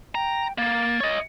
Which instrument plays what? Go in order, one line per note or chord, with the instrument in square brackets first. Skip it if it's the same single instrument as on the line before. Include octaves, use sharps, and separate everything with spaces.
[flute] G5 [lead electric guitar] A#5
[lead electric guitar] A#3 [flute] A6
[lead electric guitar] C#5 D#5